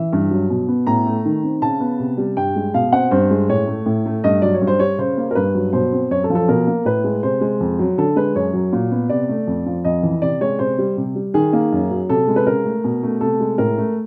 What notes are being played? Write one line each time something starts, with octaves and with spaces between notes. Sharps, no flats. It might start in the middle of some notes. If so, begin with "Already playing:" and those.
Already playing: E3 E5
G2
F#3
B2
B3
A2 A#5
A3
D#3
C4
C#3 A5
B3
C3
G3
G2 G5
G#3
B2 F5
C4 F#5
G2 C5
G#3
A2 C#5
A3
A2
A3
G2 D#5
F#3 D5
C#5
G2
C5
G3 C#5
C#3 C5
A#3
A#4
G2 B4
F#3
B2 C5
C4
F#2 C#5
A4
F3
A4
B2 A#4
A#3
A2 B4
G#3
C3 C5
G#3
F2
F#3
D3 A4
G#3 B4
F#2 C#5
F#3
A#2
B3
C3 D5
A3
F2
F3
F2 D#5
E3
C3 D5
G#3 C#5
C3 C5
G3
C3
G3
D#3 G#4
A#3
F#2
F#3
C3 A4
G#3
B4
C#3 A#4
A3
B2
A3
C3 A4
G#3
A2 A#4
A3